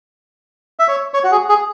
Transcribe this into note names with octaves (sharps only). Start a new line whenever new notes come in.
E5
C#5
C#5
F#4
G#4
G#4